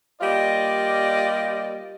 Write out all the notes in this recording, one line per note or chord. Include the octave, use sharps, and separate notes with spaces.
G3 A#3 F4 D5 D#5